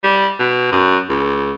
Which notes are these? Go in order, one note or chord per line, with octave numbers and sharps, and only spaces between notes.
G3
B2
F#2
C#2